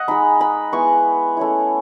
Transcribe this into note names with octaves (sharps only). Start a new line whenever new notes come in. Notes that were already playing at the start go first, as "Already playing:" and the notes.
Already playing: D#5 F#5
G#3 D#4 B5
B5
G#3 B3 E4 C#6
A3 C#4 E4